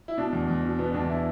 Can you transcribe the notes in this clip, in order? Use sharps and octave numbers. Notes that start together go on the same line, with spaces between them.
E4
B2 D4
E2
E2
B2
B2 B3
E2 D4
E4